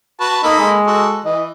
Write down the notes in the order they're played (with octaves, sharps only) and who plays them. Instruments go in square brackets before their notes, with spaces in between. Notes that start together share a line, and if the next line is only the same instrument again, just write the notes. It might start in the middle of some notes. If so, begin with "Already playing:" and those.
[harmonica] F#4 B4 A5
[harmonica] A#3 A4 B5 [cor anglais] D#4
[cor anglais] G#3
[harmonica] F#4 A4
[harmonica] E3 [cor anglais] D#5